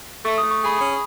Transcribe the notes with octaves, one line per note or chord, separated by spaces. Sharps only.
A3 C#6
A3 D#6
C#6
G#4
B5
C#4 B5